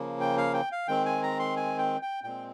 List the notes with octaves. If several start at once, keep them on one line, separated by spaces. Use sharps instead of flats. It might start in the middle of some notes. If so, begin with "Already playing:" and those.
Already playing: C#3 F3 A#3
G5
F5
G5
F5
D#3 G#3 C4 G5
G#5
A#5
C6
G#5
G5
G5
A#2 G#3 C4 G5